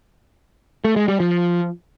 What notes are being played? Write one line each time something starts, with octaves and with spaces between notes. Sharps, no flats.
A3
G#3
G3
F3